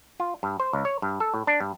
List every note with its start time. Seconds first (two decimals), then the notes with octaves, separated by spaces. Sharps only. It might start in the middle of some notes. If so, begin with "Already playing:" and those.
0.20 F4
0.43 G2
0.60 C5
0.73 C#2
0.85 C#5
1.02 G2
1.20 A4
1.34 A2
1.47 D4
1.61 G2